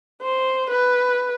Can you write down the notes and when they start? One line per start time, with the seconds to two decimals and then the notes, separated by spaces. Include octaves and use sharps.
0.22 C5
0.70 B4